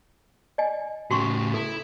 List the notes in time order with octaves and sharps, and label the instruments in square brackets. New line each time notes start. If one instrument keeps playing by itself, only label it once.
[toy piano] D5 D#5 G#5
[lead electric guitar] A2 C#3 [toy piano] F#4 C6 C#6
[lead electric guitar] E4 [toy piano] A4